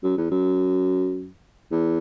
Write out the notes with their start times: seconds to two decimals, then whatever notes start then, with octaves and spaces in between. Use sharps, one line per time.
0.03 F#2
0.18 E2
0.31 F#2
1.72 E2